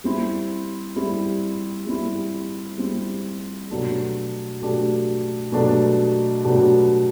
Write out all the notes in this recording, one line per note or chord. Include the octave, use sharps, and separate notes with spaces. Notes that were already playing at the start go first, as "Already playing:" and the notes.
G3 C4 E4
G3 C4 E4
G3 C4 E4
G3 C4 E4
B2 F#3 A3 D4 G4
B2 F#3 A3 D4 G4
B2 F#3 A3 D4 G4
B2 F#3 A3 D4 G4